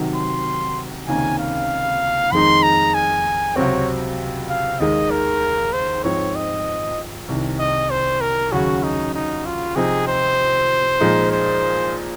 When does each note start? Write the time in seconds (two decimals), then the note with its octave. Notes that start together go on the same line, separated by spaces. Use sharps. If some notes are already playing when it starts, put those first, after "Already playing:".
Already playing: C3 D#3 F#3
0.15 C6
1.07 C#2 C3 D#3 A#3 C#4 G#5
1.39 F5
2.32 F2 D#3 G#3 D#4 C6
2.63 A#5
2.94 G#5
3.56 C#2 C3 F#3 C4 C#5
4.50 F5
4.80 D#2 D#3 G#3 D#5
5.11 A#4
5.73 C5
6.04 G#2 F3 C4 C#5
6.35 D#5
7.28 C2 C3 D#3
7.59 D#5
7.90 C5
8.21 A#4
8.52 D#2 C#3 F#3 C#4 F#4
8.83 D#4
9.14 D#4
9.46 F4
9.76 C3 F3 C4 D#4 G#4
10.07 C5
11.00 A#2 F3 G#3 D#4
11.32 C5